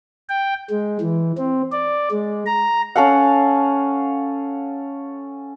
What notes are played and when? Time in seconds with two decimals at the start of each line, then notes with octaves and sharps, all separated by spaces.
0.29 G5
0.70 G#3
1.01 E3
1.38 C4
1.72 D5
2.11 G#3
2.46 A#5
2.96 C#4 A4 F5 F#5